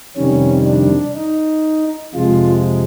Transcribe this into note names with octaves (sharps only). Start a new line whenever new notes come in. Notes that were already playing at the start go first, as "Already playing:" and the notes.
F2 C3 D#3 G3 C#4
D4
D#4
F2 C3 F3 G#3 F4